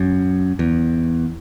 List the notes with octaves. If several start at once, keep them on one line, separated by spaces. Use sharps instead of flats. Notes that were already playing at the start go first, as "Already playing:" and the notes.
Already playing: F#2
E2